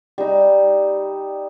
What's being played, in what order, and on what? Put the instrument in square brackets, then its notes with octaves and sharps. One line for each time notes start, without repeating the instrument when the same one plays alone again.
[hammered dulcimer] G3 D#4